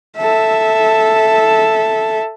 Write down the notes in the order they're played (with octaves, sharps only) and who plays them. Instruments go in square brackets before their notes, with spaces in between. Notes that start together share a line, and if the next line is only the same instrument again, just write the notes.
[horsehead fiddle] A4 E5